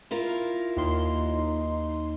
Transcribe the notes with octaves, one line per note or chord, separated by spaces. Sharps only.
E4 F4 A#4
D#2 D#4 C6